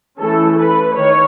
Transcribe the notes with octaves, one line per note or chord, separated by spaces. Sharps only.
E3 A3 C#4 A4
B4
D#3 C#5